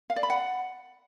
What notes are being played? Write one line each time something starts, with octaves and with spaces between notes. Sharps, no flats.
F5
D5
B5
F#5